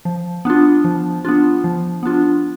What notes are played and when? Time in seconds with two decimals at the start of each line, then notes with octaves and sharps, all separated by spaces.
0.05 F3
0.45 B3 D4 F4
0.84 F3
1.25 B3 D4 F4
1.64 F3
2.03 B3 D4 F4